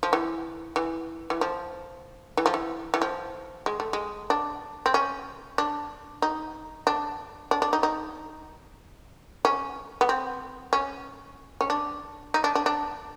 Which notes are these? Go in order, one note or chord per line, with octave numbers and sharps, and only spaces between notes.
F3
E3
E3
E3
F3
E3
F3
E3
E3
F3
G#3
A3
G#3
D4
C4
C#4
D4
D#4
D4
D4
D4
D#4
D#4
C#4
B3
C4
C#4
C#4
D4
D#4
D4
D4
D4